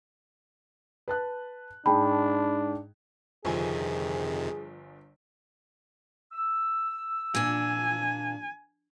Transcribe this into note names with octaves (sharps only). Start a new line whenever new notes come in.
B4 A5 F#6
G#2 D4 G#4 G5 A5 B5
G1 F2 C3 D#3 F3 G#4 G#5
E6
A#2 D4 G#5